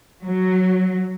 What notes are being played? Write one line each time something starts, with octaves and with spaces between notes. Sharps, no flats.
F#3